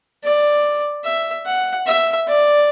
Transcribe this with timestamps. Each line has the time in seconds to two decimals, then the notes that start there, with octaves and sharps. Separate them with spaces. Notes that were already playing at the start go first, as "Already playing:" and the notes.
0.24 D5
1.05 E5
1.46 F#5
1.87 E5
2.28 D5